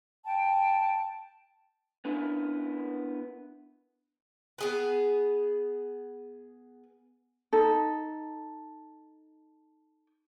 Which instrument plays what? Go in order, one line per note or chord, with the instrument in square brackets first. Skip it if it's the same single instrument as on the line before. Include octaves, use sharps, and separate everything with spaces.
[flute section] G5 A5
[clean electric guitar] B3 C#4 D4 E4 A#4 B4
[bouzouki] B3 G#4 B4
[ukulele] D#4 A4